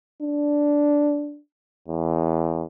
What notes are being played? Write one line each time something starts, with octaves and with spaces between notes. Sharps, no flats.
D4
E2